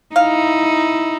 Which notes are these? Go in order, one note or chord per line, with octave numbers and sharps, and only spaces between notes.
D#4 E4 F5